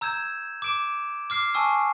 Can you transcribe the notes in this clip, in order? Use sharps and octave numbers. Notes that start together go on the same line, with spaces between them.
A#5 E6 G6 G#6 E7
D6 D7 E7
D6 F6 C7
G#5 A5 C#6 E6 C7